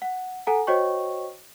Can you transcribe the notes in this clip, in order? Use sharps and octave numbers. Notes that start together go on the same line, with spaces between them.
F#5
A4 F#5 G#5 A#5
F#4 C5 C#5 D#5 G5 C#6